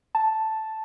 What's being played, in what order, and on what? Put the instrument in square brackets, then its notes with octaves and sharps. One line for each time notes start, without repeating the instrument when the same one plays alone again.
[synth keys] A5